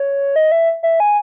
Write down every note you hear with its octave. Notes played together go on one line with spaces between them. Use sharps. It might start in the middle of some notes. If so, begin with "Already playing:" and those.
Already playing: C#5
D#5
E5
E5
G#5